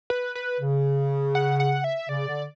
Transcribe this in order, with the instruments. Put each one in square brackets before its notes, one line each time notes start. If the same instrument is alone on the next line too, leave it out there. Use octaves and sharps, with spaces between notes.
[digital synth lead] B4
B4
[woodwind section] C#3
[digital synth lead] F#5
F#5
E5
[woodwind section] C#3 [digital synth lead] D5
[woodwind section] D3